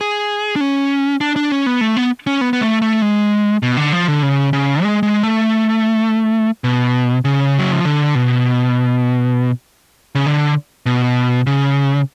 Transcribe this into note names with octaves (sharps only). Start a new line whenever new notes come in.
G#4
D4
C#4
D4
D4
C#4
B3
A3
B3
C#4
B3
B3
A3
A3
G#3
B2
D3
F3
D3
C#3
C#3
G#3
G#3
A3
B2
C#3
F#3
F3
D3
B2
C#3
D3
B2
C#3